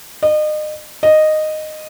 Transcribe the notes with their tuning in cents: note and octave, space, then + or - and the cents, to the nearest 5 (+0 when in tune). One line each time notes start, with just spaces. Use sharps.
D#5 -35
D#5 -10